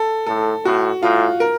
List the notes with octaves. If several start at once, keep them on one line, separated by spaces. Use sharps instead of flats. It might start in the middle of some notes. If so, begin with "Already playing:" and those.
Already playing: A4
A2 A4
A2 F#4
A2 F4
A#4